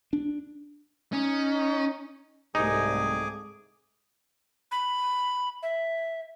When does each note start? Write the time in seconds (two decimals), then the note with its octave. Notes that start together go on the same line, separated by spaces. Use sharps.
0.13 D4
1.13 C#4 D#4
2.55 C2 G#2 A3 D#4 G#4 G#5 D6
4.72 B5
5.63 E5